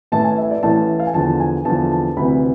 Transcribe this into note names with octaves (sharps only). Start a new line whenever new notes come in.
A1 A2 E3 A5
G#5
E5
D5
A1 A2 E3 A5
F5
G#5
E2 D3 F3 A5
G#5
E2 D3 F3 A5
A5
D2 C3 E3 B5